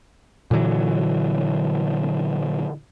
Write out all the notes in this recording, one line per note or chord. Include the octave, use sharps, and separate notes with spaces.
A#2 D3 E3 F#3